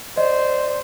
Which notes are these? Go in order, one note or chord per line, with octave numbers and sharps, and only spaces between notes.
C5 D5 D#5